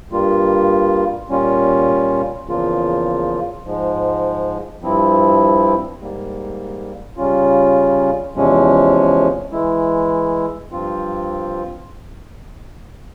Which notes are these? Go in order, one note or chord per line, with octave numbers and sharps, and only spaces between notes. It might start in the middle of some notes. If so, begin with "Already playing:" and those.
G2 G3 A#3 F4
A#2 G3 C#4 F4
E2 C#3 F3 A#3 F4
G#2 F3 G#3
G2 F3 C4 E4
G#2 G3 A#3
C#3 G3 C#4 F4
E2 C3 F3 G#3 C#4
E3 G#3 E4
G2 F3 C4 F4